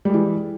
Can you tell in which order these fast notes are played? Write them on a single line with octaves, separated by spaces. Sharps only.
G3 G#3 E3